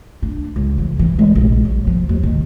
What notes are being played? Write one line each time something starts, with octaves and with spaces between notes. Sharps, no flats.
D4
C#2
E3
E3
G#3
A#1
F#3
F3
D#2
D#3